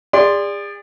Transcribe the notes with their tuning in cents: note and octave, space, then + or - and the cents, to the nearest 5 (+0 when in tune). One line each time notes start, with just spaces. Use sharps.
G#4 -40 D5 +0 C6 +0